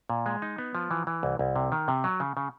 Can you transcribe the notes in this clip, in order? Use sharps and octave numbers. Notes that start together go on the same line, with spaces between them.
A#2
G#3
D#4
B3
F3
E3
E3
C2
C2
C3
D#3
C3
F#3
C#3
C#3